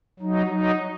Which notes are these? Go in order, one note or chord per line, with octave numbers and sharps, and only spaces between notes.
F#3 D#4
F#3 D#4